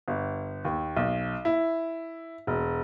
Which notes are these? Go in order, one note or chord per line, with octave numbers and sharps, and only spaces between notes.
G1
D#2
B1
E4
E1